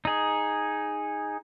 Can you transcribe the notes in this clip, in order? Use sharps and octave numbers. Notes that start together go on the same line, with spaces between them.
D#4 G#4